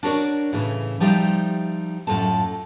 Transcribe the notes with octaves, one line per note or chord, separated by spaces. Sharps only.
D4 F#4 A#4 B4 C#5 D5
A2 C#3 E3
F3 G3 D#4 G4 C5 E5
F#2 A2 F#3 F4 A4 A5